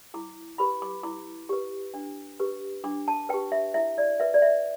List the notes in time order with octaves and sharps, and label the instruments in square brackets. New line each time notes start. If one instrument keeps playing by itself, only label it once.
[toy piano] E4 D6
G4 B4 B5
D6
E4 D6
G4 B4
D4
G4 B4
D4 D6
A5
G4 B4 G5
E5
E4 E5
D5
B4 E5
D5
E5